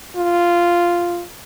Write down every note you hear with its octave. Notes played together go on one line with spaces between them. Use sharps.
F4